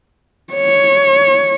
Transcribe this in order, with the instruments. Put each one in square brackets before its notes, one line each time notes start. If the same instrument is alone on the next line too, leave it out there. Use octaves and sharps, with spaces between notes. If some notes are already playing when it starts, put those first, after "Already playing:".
[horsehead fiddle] C#5